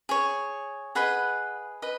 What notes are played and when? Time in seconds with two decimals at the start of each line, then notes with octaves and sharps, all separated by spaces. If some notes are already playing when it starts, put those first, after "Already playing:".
0.09 G#4 C#5
0.95 G#4 B4 D#5 F#5 B5
1.82 B4 D#5